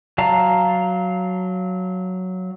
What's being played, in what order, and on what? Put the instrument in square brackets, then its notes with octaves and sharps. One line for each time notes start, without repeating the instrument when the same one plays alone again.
[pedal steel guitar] F#3 F5 A5 A#5